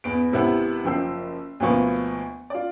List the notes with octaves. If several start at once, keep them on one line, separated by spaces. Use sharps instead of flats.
E2 B3 D7
G#1 C3 B3 E4 F#5
F#1 F3 G5 E6 C7
D2 B2 F3 A#3 B3 C#6
F4 D5